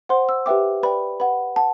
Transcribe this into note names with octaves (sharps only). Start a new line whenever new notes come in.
C5 F#5 C6
E6
G4 B4 E5 G5 D6
B4 D5 G5 B5
B4 F#5 B5
F#5 A5